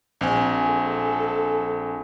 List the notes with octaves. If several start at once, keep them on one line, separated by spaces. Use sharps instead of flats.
A#1 C4 G#5
A4